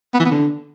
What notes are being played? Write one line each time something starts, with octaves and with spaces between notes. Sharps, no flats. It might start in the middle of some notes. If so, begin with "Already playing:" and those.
B3
E3
B3
D3